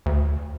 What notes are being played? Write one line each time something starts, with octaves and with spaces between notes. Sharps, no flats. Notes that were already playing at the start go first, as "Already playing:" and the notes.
D2